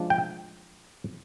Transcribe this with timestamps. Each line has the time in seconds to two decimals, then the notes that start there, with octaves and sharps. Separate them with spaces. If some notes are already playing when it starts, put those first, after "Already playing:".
Already playing: F3 G#3 D4
0.10 G5